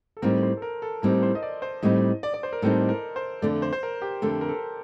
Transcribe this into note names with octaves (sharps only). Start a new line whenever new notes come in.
A4
A2 G3 C4 D#4 A#4
C5
A4
A#4
A4
A2 G3 C4 D#4 A#4
C5
D#5
D5
C5
A2 G3 C4 D#4 D#5
D5
D5
C5
A#4
A2 G3 C4 D#4 A4
A#4
C5
F2 D3 A3 D5
C5
C5
A#4
G4
F2 D3 A3 A4
A#4
A4